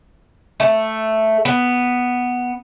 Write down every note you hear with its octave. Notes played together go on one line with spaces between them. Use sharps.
A3
B3